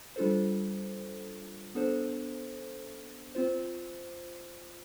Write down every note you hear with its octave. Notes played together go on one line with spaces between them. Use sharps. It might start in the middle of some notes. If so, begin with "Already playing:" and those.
G3 D4 F4 A4 C5
B3 D4 A4 C5
C4 F4 C5